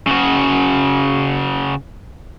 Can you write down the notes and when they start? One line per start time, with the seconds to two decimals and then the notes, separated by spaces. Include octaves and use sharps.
0.07 C#3 F#4